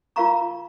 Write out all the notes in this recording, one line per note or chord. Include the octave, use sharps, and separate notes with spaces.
F4 A#4 F5 A#5 C#6